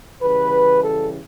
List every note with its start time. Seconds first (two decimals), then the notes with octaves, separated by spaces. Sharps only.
0.22 C#3 E3 G3 B4
0.82 A4